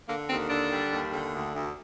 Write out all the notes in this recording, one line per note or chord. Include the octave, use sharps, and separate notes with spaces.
D3 A#3
D#2 C4
D3 D4
G3
D#2
D3
D2
D2